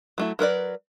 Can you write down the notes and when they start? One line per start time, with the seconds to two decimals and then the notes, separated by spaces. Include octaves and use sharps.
0.18 F#3 A3 E4
0.39 F#3 A#4 B4 D5